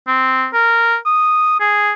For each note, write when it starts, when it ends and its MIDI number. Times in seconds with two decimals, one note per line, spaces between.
0.07 0.46 60
0.53 0.96 70
1.06 1.58 87
1.60 1.92 68